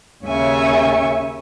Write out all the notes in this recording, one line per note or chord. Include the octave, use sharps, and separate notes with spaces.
D#2 C#3 C#5 E5 G#5 C#6